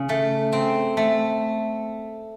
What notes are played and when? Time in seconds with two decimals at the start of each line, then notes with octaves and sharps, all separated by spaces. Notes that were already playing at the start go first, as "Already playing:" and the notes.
Already playing: C#3
0.09 A3
0.53 C4
0.97 A3